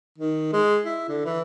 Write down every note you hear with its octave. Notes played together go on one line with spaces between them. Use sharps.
D#3
G#3
E4
D3
E3